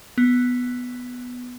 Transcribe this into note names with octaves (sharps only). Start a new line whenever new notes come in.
B3